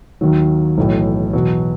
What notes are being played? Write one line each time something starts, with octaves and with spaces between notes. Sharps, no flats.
D#2 D#3 F#3
B1 A2 E3
E2 B2 F#3